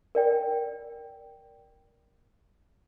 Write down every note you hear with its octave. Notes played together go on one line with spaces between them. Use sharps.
A#4 D5 G5